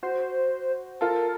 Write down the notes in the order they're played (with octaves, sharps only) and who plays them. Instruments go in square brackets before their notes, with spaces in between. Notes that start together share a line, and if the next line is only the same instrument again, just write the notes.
[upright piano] F#4 [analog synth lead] C5
[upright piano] F4 A4 [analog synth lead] A#4